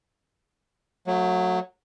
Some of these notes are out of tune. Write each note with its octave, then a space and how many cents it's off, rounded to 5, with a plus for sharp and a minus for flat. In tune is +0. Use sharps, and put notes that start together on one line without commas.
F#3 -15 A3 +20